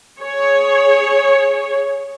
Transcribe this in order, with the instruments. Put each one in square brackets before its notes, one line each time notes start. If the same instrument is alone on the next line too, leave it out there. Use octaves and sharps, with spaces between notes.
[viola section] G#4 C#5